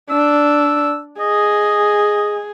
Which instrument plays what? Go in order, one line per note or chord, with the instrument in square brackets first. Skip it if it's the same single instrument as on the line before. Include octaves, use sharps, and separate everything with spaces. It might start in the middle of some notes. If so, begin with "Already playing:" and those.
[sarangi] D4 [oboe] E6
[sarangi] G#4 [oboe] D#5